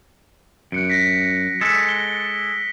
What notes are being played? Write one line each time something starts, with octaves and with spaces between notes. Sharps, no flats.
F#2 F#6 C#7 D7
A#6 B6
G#3 A4 B6
G7